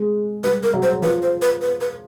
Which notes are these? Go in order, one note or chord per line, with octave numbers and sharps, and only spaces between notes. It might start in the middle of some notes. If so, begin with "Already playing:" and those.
Already playing: G#3
G3 B4
A#4
F#3
C5
F3 B4
C5
B4
B4
B4